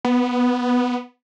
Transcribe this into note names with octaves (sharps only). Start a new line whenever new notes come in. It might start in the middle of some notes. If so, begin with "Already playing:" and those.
B3